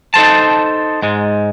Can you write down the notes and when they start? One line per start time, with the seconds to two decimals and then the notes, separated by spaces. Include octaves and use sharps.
0.14 D#4 A4 C5 A5
1.02 G#2 G#3